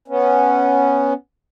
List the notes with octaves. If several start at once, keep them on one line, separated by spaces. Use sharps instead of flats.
B3 C#4